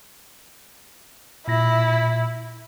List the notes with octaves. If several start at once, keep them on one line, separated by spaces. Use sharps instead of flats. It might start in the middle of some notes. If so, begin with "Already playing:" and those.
A#2 E4 E5 A#6